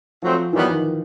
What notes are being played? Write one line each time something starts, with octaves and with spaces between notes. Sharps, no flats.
F3 F#3 A3 C4
F#2 D#3 E3 G3 B3
D#3